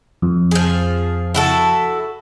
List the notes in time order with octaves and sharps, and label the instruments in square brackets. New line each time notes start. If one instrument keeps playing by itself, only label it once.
[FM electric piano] F2
[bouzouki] F3 G#4
E4 F#4 A4